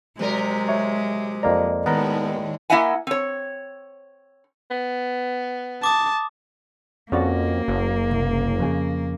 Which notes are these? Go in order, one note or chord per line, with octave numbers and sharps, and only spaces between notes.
C3 F#3 G#3 A#4
C#5 E5
F2 A#3 D5 D#5 A#5
D#2 A2 G#3 B3 A#4 A#5
A#3 E4 D#5 E5 F#5 G#5
C4 C#5
B3
A5 D6 D#6
F2 A#3 C#4 F#4 D5
F#1
C2
F2 C#3 G#4